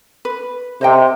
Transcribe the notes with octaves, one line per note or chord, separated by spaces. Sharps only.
B4
C3 C5 D#5 G5